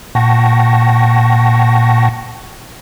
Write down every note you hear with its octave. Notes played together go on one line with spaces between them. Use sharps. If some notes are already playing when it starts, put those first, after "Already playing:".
A#2 F#5 G5 A5 C#6 A#6